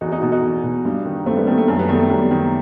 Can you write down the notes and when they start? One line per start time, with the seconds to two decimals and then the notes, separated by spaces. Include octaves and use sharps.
0.01 E2 D#4 F#4
0.11 D#4 F#4
0.22 B2 D#4 F#4
0.32 D#4 F#4
0.43 E2
0.64 B2
0.85 G2
1.05 D#3
1.26 G2 A3 C4
1.36 G3 B3
1.47 D#3 A3
1.58 A3
1.68 F#2 A3
1.79 G3 B3
1.88 D#3 A3
1.99 A3
2.10 F#2 G3 B3
2.31 D#3